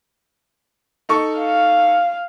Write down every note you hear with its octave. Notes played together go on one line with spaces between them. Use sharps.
D#4 A4 C#6
F5